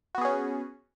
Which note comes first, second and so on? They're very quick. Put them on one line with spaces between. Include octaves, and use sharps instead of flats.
F#4 B3 G#4 C#4